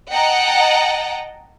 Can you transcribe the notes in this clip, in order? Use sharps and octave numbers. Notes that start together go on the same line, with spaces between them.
D#5 F#5 G5 A5 A#5